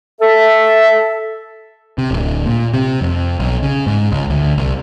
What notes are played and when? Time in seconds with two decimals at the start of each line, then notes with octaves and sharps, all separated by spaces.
0.21 A4 E5
1.98 C3
2.11 D1
2.46 A#2
2.74 C3
3.01 F2
3.40 B1
3.62 C#3
3.87 G#2
4.12 C#2
4.30 D2
4.58 C2